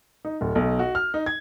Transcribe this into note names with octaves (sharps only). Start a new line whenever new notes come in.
D#4
D1
B1
F#4
F6
D#4
G#6